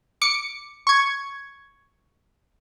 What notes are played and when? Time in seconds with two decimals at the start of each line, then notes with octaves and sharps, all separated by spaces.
0.22 D6 C#7
0.87 C#6 G#6